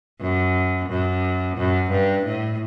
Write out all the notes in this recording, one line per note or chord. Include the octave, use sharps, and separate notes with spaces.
F#2
F#2
F#2
G2
A2